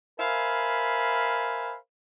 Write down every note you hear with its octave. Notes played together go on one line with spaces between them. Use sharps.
A#4 C5 E5 F5 G#5 B5